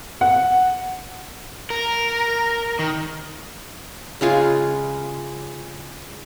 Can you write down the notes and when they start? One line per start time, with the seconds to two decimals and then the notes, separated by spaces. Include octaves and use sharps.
0.21 F#5
1.70 A#4
2.79 D#3
4.21 C#3 G#3 F4 G#5